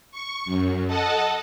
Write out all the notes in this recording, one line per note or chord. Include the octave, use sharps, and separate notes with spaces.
C#6
F#2
A4 D#5 F#5 A5